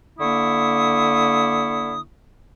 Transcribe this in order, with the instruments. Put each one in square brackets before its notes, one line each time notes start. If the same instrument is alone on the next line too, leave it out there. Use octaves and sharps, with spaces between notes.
[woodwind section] D3 A#3 E4 C#6 D#6